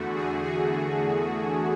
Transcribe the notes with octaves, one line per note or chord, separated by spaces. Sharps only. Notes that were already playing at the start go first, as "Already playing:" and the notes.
Already playing: E2 D3 A3 F#4
G#4
G#4